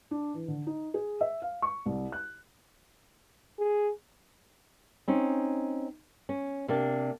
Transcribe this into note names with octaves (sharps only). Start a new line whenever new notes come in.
D4
E3
D3
D#4
G#4
E5
F5
C#6
C2
F#6
G#4
C4 C#4 D#4
C#4
C3 A#3 D4